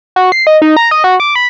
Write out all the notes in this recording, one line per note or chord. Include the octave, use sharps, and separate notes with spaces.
F#4
C7
D#5
D#4
A#5
D#5
F#4
D6
B5